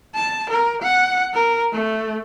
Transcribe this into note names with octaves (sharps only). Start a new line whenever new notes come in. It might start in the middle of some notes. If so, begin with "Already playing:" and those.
A5
A#4
F#5
A#4
A3